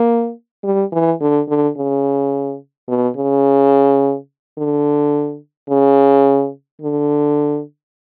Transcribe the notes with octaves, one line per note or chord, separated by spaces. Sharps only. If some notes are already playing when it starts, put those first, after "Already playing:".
Already playing: A#3
G3
E3
D3
D3
C#3
B2
C#3
D3
C#3
D3